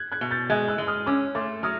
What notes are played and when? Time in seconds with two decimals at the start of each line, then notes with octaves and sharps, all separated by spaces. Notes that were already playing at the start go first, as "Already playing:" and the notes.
Already playing: F#6 G#6
0.12 F#6 G#6
0.21 B2
0.31 G6 A6
0.50 G#3 F#6 G#6
0.68 E6 F#6
0.78 G#3
0.87 D#6 F6
1.06 C#4 D6 E6
1.35 A3 C6 D6
1.63 F#3 D#6 F6